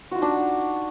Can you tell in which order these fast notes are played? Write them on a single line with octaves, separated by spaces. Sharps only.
F#4 F4 D#4 D4